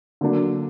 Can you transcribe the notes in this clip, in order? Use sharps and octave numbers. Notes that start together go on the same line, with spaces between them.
D3 F#3 A#3 D4